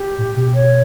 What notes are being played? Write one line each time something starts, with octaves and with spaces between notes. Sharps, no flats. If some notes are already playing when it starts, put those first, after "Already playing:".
Already playing: G4
A2
B2
C#5